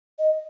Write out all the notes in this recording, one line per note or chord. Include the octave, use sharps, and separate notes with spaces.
D#5